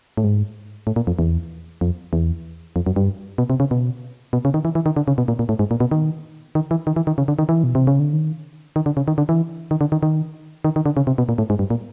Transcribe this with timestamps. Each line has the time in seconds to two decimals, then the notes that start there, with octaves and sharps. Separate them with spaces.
0.17 A2
0.24 G#2
0.87 A2
0.96 A#2
1.07 F2
1.19 E2
1.81 F2
2.13 E2
2.76 F2
2.86 F#2
2.96 G2
3.38 B2
3.50 C3
3.60 C#3
3.71 B2
4.33 B2
4.45 C#3
4.54 D#3
4.65 E3
4.75 E3
4.86 D#3
4.96 D3
5.08 C#3
5.18 B2
5.28 A#2
5.39 A#2
5.49 A2
5.59 G#2
5.71 A#2
5.80 B2
5.91 D#3
6.55 D#3
6.71 E3
6.87 D#3
6.96 E3
7.07 D#3
7.18 C#3
7.28 D3
7.39 D#3
7.49 E3
7.64 B2
7.75 C3
7.87 C#3
8.00 D3
8.13 D#3
8.76 D#3
8.86 D3
8.97 C#3
9.08 D#3
9.18 D3
9.29 E3
9.71 D#3
9.81 D3
9.92 D#3
10.03 D#3
10.64 D#3
10.76 D#3
10.86 D3
10.97 C#3
11.07 C3
11.18 B2
11.29 A#2
11.38 A2
11.50 G#2
11.59 G2
11.70 A#2